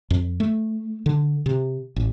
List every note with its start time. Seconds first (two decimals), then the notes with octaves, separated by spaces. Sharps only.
0.10 F2
0.40 A3
1.06 D3
1.46 C3
1.96 A1